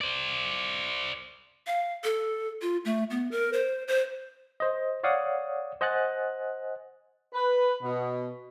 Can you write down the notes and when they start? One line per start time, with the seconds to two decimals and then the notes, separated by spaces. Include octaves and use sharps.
0.01 C5 D5
1.67 F5
2.04 A4
2.62 F4
2.85 A3
3.10 B3
3.31 A#4
3.53 C5
3.88 C5
4.60 C5 D#5
5.03 C#5 D5 F5 F#5 D#6
5.81 C5 D#5 F#5 G#5 F#6 A6
7.33 B4
7.82 B2